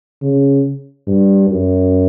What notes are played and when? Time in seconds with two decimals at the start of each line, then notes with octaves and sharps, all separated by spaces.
0.22 C#3
1.08 G2
1.49 F#2